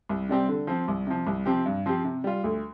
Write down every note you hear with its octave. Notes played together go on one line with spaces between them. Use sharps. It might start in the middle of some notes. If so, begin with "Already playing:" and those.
C2
C3 G3 C4 G4
D3
F3 C4
C2
C3 F3
C2
C3 F3 C4 G4
G2
F3 C4 G4
C3
G3 F4
D2